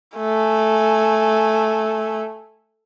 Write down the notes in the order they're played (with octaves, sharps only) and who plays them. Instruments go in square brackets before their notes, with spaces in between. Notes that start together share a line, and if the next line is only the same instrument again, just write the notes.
[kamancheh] A3 G#5